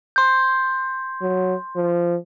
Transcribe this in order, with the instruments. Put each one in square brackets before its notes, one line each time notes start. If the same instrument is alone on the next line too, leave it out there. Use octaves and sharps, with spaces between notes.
[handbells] C6 G6
[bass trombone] F#3
F3